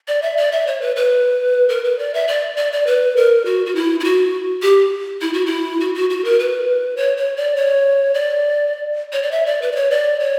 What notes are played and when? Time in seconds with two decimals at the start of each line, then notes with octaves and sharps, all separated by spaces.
0.08 D5
0.22 E5
0.37 D5
0.52 E5
0.67 C#5
0.81 B4
0.96 B4
1.69 A#4
1.84 B4
1.99 D5
2.14 E5
2.27 D5
2.57 D5
2.72 D5
2.86 B4
3.16 A#4
3.45 F#4
3.66 F#4
3.75 E4
4.00 E4
4.04 F#4
4.62 G4
5.21 E4
5.33 F#4
5.46 E4
5.80 F#4
5.95 F#4
6.10 F#4
6.24 A#4
6.39 B4
6.97 C#5
7.17 C#5
7.36 D5
7.56 C#5
8.14 D5
9.13 C#5
9.23 D5
9.31 E5
9.46 D5
9.62 B4
9.72 D5
9.76 C#5
9.91 D5
10.20 C#5